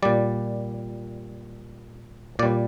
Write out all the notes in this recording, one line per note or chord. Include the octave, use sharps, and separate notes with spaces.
A#2 G3 D5
A#2 G3 D5